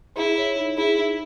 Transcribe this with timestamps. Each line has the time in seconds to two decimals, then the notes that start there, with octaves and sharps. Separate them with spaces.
0.17 E4 G#4
0.38 C#5
0.58 D#4
0.77 E4 G#4
0.98 D#4